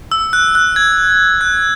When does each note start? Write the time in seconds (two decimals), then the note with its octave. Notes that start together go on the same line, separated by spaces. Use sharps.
0.12 E6
0.33 F#6
0.55 F#6
0.76 G#6
1.41 F#6